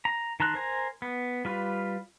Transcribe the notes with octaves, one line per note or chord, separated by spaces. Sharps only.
A#5
D#3 A5 A#5 C6 F#6
A#4 C5 G#5 A#5
B3
G3 F4 B4